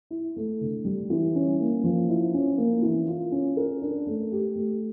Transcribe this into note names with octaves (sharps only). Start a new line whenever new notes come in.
E4
A3
D3
G3
E3
C#4
A#3
F3
E4
C#4
A#3
E3
F4
C#4
A#4
D4
A3
G4
A3